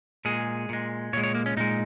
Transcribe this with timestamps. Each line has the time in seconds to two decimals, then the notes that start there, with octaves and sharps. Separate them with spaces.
0.25 A#2 G#3 G#4
0.69 A#2 G#3
1.13 A#2 C#5
1.17 G#3
1.23 C#5
1.34 A#3
1.46 C#4
1.57 A#2 G#3 D#4